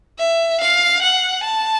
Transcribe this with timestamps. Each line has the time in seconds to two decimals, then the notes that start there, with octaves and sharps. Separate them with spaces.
0.19 E5
0.61 F5
1.02 F#5
1.44 A5